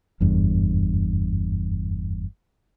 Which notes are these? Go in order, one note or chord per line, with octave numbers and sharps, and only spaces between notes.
F#1 E2 G2